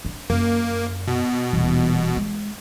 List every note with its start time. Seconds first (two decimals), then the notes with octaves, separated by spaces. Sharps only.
0.05 D4
0.30 F#2 A#3
1.08 B2
1.53 D#1 E3
2.17 G#3